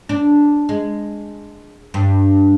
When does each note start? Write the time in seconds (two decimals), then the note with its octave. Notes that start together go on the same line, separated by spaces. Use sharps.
0.09 D4
0.69 G#3
1.94 G2